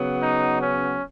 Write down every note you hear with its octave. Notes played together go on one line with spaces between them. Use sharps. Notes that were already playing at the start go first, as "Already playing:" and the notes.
Already playing: C#3 F#3 B3
D#4
C#4